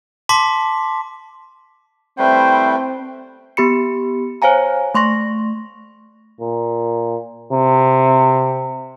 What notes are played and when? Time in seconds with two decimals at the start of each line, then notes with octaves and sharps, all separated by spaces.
0.29 A5 C6 D6 B6
2.19 G3 A3 C4 E4 B4 C5 G5
3.57 B3 G4 B5 C#7
4.42 C5 C#5 F5 G#5 A#5
4.94 A3 C6 C#6 A#6
6.41 A#2
7.53 C3